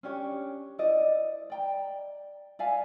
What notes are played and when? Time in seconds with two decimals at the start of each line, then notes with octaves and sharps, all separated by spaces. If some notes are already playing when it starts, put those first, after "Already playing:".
0.03 C#4 D4 G4 C#5
0.78 E4 C5 D5 D#5
1.50 D5 G5 A#5
2.59 D5 E5 F5 G#5